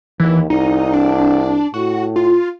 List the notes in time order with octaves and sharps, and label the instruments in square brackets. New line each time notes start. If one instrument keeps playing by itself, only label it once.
[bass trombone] D#2 [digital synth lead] E3
[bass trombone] C2 [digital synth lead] D#4
[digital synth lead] D4
[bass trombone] A2 [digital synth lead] F#4
[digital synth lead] F4